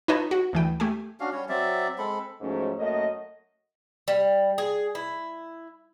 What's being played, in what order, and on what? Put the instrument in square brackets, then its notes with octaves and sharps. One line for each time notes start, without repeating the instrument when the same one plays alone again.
[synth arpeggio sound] D#4 F4 B4 C#5 D#5 A5
F#4
D2 E3 G5
A3 G4 G#5
[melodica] C#4 D4 F#4 F5
G3 C#4 C#5
F#3 C4 D5 E5
G#3 C4 A4 B5
[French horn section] G#2 F3 F#3 A3 C#4
F#2 A3 A#3 D#5
[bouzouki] G3
G#4
E4